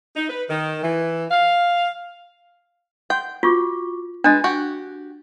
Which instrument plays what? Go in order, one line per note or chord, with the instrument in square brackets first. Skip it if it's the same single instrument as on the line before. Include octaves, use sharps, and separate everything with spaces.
[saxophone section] D#4
B4
D#3
E3
F5
[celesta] F#5 C6 G6 [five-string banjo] G5
[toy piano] F4 [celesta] F#4 C#6 D6
[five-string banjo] G#3 B4 [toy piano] D4 [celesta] F#6 A6
[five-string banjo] F#4 G4